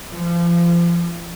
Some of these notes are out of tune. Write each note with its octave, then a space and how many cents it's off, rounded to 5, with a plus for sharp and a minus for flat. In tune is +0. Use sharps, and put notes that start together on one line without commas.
F3 -30